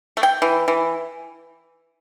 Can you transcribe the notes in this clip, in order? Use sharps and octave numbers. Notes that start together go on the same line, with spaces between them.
A3
G5
E3
E3